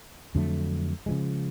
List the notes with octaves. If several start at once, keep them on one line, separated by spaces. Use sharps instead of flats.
F2 D3 F#3 A3
C#3 F3 G#3